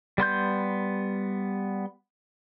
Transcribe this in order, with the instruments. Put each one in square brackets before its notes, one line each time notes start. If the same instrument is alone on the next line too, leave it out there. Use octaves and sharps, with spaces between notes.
[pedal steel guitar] G3 B3 C6 G6